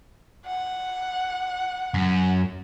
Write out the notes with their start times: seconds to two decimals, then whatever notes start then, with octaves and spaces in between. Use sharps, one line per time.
0.46 F#5
1.94 F#2